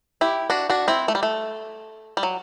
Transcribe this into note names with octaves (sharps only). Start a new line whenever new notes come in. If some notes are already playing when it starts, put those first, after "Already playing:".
E4 G4
D4 F#4
D4 F#4
C4 E4
A3
G3
A3
G3
F#3